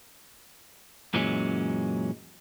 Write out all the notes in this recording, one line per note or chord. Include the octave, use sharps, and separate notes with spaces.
F#2 A#2 E3 F#3 G#3 C#4